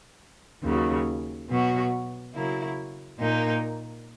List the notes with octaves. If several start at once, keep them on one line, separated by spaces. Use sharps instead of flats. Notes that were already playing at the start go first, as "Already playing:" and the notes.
D#2 C#3 F#3
B2 F#3 B3 F#4
C#3 F#3 A#3 E4
A#2 A#3 D#4